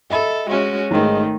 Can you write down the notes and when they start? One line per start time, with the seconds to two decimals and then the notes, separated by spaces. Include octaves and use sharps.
0.10 A4 D#5 E5 B5
0.47 G#3 C#4 F#4
0.91 G#1 D#3 G#3 A3 D#5